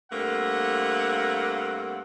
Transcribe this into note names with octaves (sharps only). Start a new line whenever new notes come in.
G2 A3 A#3 C4 F#5